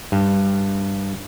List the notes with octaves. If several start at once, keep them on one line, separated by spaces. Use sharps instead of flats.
G2